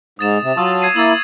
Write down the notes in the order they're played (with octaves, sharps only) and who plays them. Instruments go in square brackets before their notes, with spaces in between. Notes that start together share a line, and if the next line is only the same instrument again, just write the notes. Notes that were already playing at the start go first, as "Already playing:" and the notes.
[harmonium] G#2 [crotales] D#6 A6 E7
[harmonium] C3
[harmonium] F#3 F4 A5 [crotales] C#6 D#6 E6
[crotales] G#6 C7 D#7
[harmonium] A#3 E4 [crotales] A6 F#7
[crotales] F#7